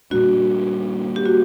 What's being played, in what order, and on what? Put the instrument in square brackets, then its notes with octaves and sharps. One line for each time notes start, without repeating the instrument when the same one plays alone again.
[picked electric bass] A#2 G3 A#3 D4 [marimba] F#4
[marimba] G4
F#4